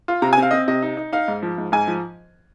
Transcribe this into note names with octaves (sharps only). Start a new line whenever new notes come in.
F4
C3 A#5
G#5
C4 F5
C4 D#5
C3 D#5
D#4
D#4
D#4 F5
G#2
F3
G#2
G#2 G#5
F3